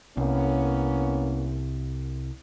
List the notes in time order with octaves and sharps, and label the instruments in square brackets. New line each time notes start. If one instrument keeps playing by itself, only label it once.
[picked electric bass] C2 [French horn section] A#3 B3 C#4